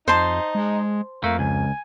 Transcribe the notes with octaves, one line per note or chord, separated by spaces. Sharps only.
F2 D#4 C5 A5 C6
G#3
F2 A3 A#3
C#2 G#5